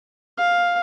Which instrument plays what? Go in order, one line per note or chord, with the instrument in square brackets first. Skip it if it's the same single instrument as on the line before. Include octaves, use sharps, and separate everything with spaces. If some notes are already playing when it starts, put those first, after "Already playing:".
[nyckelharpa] F5